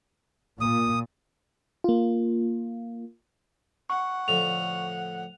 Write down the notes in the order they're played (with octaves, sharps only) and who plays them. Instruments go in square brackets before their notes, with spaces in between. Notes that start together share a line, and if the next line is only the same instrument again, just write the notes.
[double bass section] A#2 [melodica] D#6
[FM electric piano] A#3 F4
[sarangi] F#5 [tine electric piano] C#6
[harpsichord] A2 D3 F3 [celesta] F7